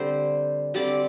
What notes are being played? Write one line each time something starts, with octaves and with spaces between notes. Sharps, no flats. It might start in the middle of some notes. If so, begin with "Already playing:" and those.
Already playing: D3 G3 C4 C5
D3 G3 C4 D5